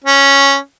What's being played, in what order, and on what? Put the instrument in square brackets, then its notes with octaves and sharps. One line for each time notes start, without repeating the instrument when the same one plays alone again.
[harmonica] C#4